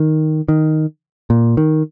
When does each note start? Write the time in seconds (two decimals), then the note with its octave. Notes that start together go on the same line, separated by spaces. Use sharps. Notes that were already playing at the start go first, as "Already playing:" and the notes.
Already playing: D#3
0.48 D#3
1.30 A#2
1.57 D#3